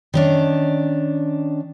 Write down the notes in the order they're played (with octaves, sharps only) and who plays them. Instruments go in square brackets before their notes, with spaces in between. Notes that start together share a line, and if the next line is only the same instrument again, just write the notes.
[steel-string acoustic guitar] D#3 C#4 D4